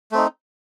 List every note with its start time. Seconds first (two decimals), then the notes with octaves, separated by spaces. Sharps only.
0.12 A3
0.15 C4
0.17 D#4